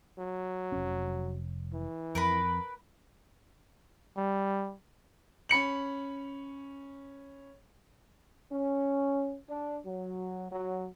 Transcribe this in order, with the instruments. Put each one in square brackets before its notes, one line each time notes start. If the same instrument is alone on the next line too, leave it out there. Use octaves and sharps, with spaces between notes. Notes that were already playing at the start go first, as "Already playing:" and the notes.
[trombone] F#3
[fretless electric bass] F1 C#4
[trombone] E3
[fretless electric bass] F2 [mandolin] A#4 B4 B5
[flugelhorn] G3
[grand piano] C#4 B5 C#7 F#7
[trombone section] C#4
D4
F#3
F#3